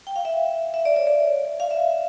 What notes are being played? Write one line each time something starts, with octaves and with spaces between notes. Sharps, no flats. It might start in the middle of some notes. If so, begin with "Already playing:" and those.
G5
F5
E5
E5
D5
C#5
D5
F5
E5